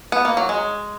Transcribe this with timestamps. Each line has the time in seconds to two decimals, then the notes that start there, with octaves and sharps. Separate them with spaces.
0.12 B3
0.25 A#3
0.37 F#3
0.49 G#3